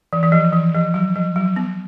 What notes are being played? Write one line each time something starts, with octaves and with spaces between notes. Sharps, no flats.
E3
E3
F3
E3
F3
F#3
F3
F#3
B3